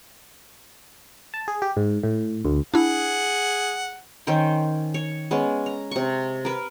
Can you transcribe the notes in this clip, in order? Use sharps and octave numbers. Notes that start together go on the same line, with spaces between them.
A5
G#4
G4
G#2
A2
D2
D4 E4 G#4 F#5
D#3 C#4 C5 G5
C#5
G#3 B3 C#4
A#5
C3 C#6
A#4 B4